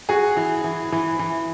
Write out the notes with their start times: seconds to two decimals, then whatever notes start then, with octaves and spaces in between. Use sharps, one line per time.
0.09 F#4 G#4
0.37 E3
0.64 E3
0.92 E3
1.19 E3